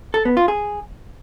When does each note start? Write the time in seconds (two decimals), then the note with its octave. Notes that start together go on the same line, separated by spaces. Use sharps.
0.14 A4
0.25 B3
0.37 F4
0.48 G#4